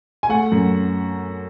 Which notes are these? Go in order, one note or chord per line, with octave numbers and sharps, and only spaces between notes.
G#5
A3 F#5
F#2